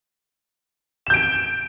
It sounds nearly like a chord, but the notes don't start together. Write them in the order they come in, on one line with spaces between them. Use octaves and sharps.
E7 G6 D7